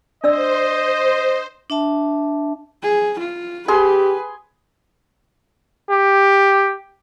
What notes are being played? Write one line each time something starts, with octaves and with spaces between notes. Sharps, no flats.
D4 C5 D5 D#5 E6
D4 E5 A5
G#4
F4
G4 G#4 B4 C6
G4